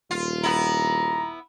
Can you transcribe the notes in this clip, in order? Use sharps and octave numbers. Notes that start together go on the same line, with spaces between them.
D#1 F4
B3 E4 A#5